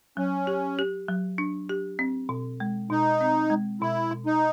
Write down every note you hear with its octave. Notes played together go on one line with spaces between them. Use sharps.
F#3 C#4
G4
G4
F#3
D4
G4
C4
B2
G#3
B2 D#4
C4
G#3
B2 E4
B2
D#4